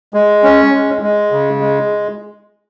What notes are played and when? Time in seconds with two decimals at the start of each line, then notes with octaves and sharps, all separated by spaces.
0.14 G#3
0.43 C#4
0.73 G#3
1.02 G#3
1.32 C#3
1.61 G#3